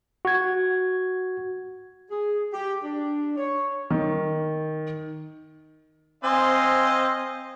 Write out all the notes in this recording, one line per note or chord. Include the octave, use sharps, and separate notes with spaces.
F#4 G#6
G#4
G4
D4
C#5
D#3
C4 C5 D#5 F5 G#5